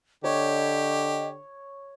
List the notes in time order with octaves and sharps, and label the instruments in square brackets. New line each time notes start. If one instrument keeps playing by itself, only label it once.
[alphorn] D3 [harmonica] G4 [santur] C#5 [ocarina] D#5